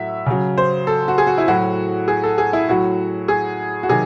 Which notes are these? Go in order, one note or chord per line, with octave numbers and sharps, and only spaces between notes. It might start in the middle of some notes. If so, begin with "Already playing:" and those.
Already playing: A2 F#3 E5
C#3 F#3
C5
A4
F#4
G#4
F#4
E4
A2 F#3 F#4
G#4
A4
G#4
E4
A2 F#3 F#4
G#4
F#4
C3 D#3 F#3 G#4